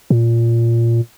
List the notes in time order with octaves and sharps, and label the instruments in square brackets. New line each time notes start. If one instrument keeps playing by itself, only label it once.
[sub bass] A#2